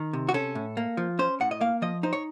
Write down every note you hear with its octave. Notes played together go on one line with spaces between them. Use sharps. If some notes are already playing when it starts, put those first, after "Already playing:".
Already playing: D#3
C3
F#4
C#4 A4
A2
A#3
F3
C#4 C5
A2 F#5
D#5
A#3 F5
F3 D#5
D#4 C5
C#5